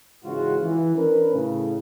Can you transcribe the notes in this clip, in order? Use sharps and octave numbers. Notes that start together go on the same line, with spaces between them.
G#2 C#3 E3 G#3 F4 F#4
E3
C#4 D4 A#4 B4
A2 C#3